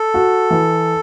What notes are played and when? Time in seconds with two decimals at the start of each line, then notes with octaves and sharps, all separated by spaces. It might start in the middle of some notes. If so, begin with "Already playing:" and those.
Already playing: A4
0.14 F#4
0.50 E3